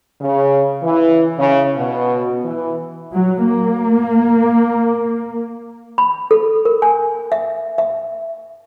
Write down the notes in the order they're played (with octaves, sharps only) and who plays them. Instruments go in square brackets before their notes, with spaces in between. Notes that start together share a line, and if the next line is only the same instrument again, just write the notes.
[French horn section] C#3
E3
C#3
B2
E3
[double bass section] F#3
A#3
[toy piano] B5
A4
A#4
G#5
E5
E5